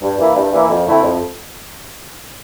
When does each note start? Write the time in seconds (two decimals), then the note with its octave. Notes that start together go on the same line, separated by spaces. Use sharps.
0.02 G2
0.18 E3 A#3 E4
0.36 G2
0.52 E3 A#3 E4
0.69 F2
0.86 D3 A3 C4 E4
1.03 F2